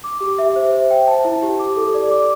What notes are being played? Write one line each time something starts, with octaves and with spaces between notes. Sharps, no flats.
D6
G4
E5
C5
C5
G5
A5
E4
G4
D6
A4
D5
D6